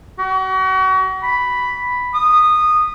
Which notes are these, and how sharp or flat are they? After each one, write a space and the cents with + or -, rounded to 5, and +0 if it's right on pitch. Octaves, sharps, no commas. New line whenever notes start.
F#4 +35
B5 +0
D#6 -15